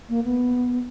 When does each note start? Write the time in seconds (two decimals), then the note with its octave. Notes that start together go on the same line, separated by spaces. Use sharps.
0.09 A#3
0.24 B3